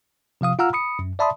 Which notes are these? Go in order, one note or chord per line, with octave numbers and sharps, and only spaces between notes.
C3 F3 F5 D#6
F4 F5 F#5 A#5 E6 F6
B5 D#6 C#7
F#2
D5 E5 A5 B5 C6 D#6